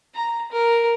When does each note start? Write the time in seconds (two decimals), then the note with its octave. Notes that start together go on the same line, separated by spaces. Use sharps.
0.15 A#5
0.52 A#4